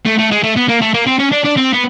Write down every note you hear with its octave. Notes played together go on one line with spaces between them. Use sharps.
A3
A3
G#3
A3
B3
A#3
A3
A#3
C4
C#4
D4
D4
C4
B3